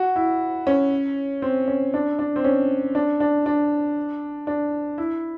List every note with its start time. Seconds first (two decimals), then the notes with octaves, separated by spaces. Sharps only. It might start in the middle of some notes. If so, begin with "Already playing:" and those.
Already playing: F#4
0.16 E4
0.67 C#4
1.42 C4
1.68 C#4
1.94 D4
2.19 D4
2.36 C4
2.44 C#4
2.95 D4
3.20 D4
3.46 D4
4.47 D4
4.98 E4